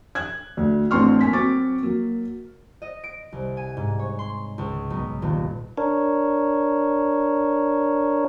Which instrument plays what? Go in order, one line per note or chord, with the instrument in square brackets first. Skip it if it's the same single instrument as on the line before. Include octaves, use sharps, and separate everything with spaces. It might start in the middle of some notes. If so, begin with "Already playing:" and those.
[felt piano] F#6 G#6
D2
A1 C4 D4 C6 C#6 F6
A#3 G#5 B6
F#3 C4 C#6 D6 A6
F#3 A#3
[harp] D#5
D7
C2
G#5
G#2
C#5
C6
C#2
B1
D#1
[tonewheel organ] D4 A#4 C#5